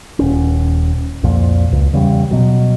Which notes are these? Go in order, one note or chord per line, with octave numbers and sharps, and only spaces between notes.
D#1 C#4
C2 F2 A#2
C#2
E2 C#3 G3
B2 F#3